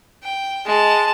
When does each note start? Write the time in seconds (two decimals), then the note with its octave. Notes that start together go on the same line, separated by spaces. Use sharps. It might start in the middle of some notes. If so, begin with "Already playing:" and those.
0.24 G5
0.66 G#3 A5